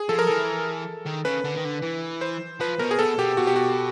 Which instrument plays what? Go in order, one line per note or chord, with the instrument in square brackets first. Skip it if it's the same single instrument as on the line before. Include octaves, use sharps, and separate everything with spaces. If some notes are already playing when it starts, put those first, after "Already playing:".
Already playing: [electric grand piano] G#4
[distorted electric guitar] F3 [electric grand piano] A4
[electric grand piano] A#4
[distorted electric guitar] E3 [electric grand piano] A4
[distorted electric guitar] D#3
[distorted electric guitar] C#3 [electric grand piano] B4
[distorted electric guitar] D3
D#3
D3
E3
[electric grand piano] C5
[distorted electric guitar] F3 [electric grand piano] B4
[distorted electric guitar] B2 [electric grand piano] A#4
[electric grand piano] G#4
[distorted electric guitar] B2 [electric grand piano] A4
[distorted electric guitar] B2 [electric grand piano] G4
[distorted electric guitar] B2 [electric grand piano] F#4
[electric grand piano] G4
F#4